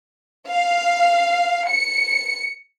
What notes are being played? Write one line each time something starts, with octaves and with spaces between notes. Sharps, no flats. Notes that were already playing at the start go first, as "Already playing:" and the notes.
F5
C#7